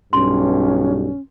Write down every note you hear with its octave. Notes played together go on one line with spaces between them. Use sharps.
B1 G2 C#4 C6